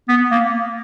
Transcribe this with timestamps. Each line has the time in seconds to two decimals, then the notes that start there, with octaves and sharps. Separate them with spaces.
0.09 B3
0.31 A#3